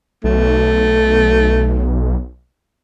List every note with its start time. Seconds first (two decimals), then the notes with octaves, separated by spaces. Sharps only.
0.24 B1 A3